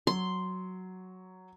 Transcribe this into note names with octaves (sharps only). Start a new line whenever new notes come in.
F#3 C6